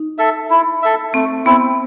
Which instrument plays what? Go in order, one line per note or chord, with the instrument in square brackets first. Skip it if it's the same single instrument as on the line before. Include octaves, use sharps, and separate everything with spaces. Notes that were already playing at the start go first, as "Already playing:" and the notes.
Already playing: [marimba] D#4
[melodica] A4 E5
E4
A4 E5
[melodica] A3 [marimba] C4
[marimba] B3 [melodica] C4 E4